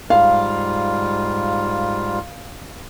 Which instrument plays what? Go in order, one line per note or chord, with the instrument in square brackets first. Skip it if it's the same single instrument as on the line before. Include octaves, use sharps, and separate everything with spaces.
[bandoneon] G#2 G3 F4 [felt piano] F5